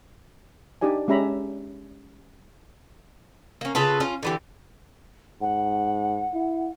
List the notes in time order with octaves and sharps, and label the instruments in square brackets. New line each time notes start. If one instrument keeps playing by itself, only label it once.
[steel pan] D4 D#4 G4 D5 G#5
G#3 C#4 G4 E5 A#5 B5
[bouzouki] A#3 C#4
C#3 F4 A4 B4
C#4 F4
D3 E3 G4
[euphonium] G#2 [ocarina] F#5
[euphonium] E4